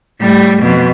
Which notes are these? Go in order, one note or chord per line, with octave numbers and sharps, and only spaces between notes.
A2 G3
F2 B2